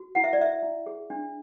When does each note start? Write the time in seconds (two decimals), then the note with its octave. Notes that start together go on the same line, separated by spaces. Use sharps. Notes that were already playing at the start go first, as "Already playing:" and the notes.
Already playing: F#4
0.15 E4 F#5
0.24 E5
0.33 D5
0.39 E4 E5
0.63 E4
0.86 G#4
1.10 D4